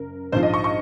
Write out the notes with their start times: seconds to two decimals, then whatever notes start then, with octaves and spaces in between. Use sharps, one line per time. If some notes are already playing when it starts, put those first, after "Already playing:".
Already playing: F#1 A#4
0.32 A#1 G#2 F3 C5
0.43 D#5
0.54 C#6
0.64 C#6